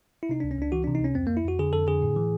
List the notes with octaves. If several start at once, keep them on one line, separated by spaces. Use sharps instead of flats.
E4
C3 D#4
C#2 D4
C#4
C#2 D4
E3 F#4
C3 D4
D#4
C#2 C#4
F2 C4
F2 A#3
E4
F2 F#4
D3 G#4
F2 A4
D3 G#4
A2
E3